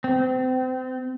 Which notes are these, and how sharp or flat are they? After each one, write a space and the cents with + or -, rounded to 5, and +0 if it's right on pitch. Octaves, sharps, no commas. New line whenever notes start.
C4 -30